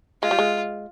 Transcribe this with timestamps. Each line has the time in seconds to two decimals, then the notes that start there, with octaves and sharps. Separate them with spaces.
0.22 G#3 F4
0.31 G3
0.39 G#3